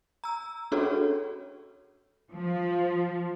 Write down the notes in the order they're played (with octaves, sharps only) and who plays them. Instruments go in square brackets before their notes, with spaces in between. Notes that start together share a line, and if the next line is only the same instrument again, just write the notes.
[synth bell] A#5 E6
C#4 D4 F#4 G#4 A4 C#5
[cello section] F3